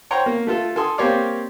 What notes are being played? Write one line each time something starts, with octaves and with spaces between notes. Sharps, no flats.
C5 C#5 G5 A#5 C6 C#6
A#3
A3 F4 A4
A4 G#5 C6 D#6
A#3 C4 G4 C#5 D5 F5